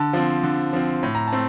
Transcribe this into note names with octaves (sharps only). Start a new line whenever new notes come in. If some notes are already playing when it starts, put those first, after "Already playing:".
Already playing: D3 A5
F3 C4
D3
F3 C4
A2
A#5
A5
A3 C4